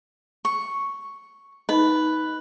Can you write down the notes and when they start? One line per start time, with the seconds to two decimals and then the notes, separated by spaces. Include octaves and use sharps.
0.45 C#6
1.69 D#4 B4 D#5